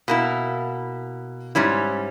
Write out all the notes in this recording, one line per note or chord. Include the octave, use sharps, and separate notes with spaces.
B2 A#3 E4
G#2 G3 C#4 E4